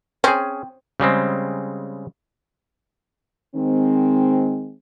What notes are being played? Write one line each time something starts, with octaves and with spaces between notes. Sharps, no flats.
C4 C#4 G#4
C#3 G3 G#3 C4
D#3 G#3 C4